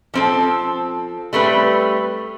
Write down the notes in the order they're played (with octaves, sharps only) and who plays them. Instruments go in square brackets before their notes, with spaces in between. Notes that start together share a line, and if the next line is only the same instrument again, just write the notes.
[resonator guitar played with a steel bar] F3 C4 A4
G3 A3 C4 B4